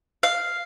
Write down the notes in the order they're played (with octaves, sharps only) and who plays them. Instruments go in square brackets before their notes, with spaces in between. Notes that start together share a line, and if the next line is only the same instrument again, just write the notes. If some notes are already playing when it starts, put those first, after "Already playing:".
[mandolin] F5